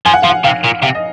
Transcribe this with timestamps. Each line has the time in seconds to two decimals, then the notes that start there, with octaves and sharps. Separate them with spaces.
0.06 F3 G#5
0.14 F#5
0.22 F3 F5
0.30 F#5
0.44 C3 F5
0.64 A#2
0.83 C3 F5
0.95 D#5